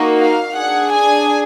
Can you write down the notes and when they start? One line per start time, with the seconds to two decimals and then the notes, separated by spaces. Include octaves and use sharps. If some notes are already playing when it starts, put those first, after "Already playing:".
Already playing: A#3 D#4 F#4
0.18 F5
0.55 D4 G#4 F#5
0.92 G#5